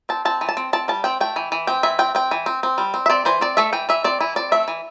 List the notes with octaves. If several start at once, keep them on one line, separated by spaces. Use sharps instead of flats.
C4 A5
C4 A5
E3
A5
C4
C4 A5
G3 A5
C4 G5
A3 G5
E3
E3
C4 G5
E3 E5
C4 G5
C4 G5
E3
C4
C4
G3
C4
E5
C4 D5
E3 C5
C4 D5
A3 E5
E3 G5
E3 E5
C4 D5
E3 E4
C4 D5
A3 E5
E3